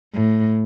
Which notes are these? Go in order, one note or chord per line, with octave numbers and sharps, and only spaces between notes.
A2